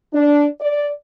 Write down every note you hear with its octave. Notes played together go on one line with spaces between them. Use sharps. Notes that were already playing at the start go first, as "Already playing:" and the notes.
D4
D5